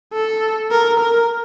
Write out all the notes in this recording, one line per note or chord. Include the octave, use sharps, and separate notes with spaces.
A4
A#4
A#4